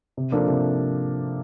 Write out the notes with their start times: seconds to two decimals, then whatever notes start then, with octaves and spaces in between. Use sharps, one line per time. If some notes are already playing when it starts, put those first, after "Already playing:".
0.17 C3
0.32 F3 A#3 D4 A4
0.48 C3